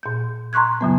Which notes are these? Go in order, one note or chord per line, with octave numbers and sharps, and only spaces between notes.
A#2 G6
A#5 C6 C#6 F#6 G#6
F#2 C#3 F#3 B3